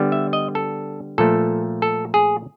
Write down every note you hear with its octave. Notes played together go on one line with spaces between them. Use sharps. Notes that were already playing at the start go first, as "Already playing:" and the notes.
Already playing: D3 G3 B3
E5
D#5
A4
A#2 F3 A3 A4
A4
G#4